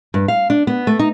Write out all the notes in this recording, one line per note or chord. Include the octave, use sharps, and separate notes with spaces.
G2
F5
D4
B3
A3
D#4